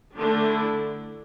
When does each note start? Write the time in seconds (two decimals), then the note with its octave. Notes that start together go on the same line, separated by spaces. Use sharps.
0.16 D3 A3 D4
0.47 E4